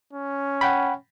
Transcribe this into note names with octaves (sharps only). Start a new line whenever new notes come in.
C#4
F#5 G5 B5